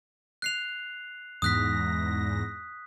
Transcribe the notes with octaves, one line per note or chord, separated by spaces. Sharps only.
F#6 C7 F7
E2 G#2 D#6 F#6 A#6 B6